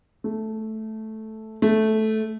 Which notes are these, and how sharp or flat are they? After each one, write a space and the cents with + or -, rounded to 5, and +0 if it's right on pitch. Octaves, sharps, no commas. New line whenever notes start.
A3 -5
A3 -10